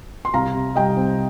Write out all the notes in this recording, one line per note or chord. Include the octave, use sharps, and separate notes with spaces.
C6
C2 F5 A#5
C3
G3 D#5 G5
C4